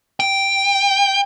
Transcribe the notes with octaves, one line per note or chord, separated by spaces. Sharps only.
G5